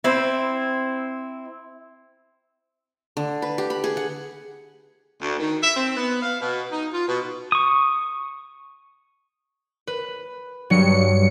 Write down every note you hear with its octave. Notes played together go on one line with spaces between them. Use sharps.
C4 E4
D3
B4
G4
B5
G#4
F#5
D2
D#3
E5
C4
B3
F5
B2
D#4
F4
B2
C#6 D#6
B4
G2 F#3 C#7